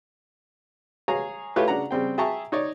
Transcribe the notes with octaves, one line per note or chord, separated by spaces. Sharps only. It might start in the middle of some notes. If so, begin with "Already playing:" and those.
G#4 C#5 F5 G#5 A#5
A3 E4 F4 G4 B4 C#5
C#3 D4 F#5 A#5
C#3 G3 C4 G5
G#4 E5 G5 A5 A#5 C#6
D#4 C#5 D5